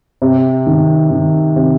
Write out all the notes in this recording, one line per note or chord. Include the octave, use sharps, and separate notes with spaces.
C3
D#3
D#3
C3